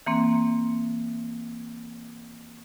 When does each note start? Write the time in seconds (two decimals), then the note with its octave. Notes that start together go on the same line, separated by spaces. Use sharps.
0.06 E3 A#3 C4